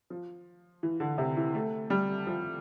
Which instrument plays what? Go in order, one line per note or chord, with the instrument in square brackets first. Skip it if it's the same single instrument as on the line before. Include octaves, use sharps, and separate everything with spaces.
[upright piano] F3
E3
D3
C3
E3
A3
G3
F3